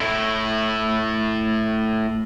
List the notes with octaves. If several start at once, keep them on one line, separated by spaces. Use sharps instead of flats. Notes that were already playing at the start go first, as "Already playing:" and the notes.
A2 E4